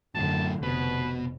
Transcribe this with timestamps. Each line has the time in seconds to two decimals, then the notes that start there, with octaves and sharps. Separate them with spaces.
0.15 F#2 A2 D3 F3 A5
0.63 F1 B2 B4